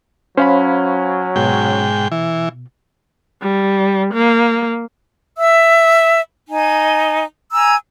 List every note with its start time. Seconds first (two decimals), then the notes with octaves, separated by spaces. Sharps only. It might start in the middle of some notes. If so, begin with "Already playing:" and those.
0.37 F#3 C#4 C5 F5 B5
1.36 G#2 B2 G5
2.12 E3
3.42 G3
4.14 A#3
5.37 E5 E6
6.48 D#4 G#5
7.53 G#5 A#5 E6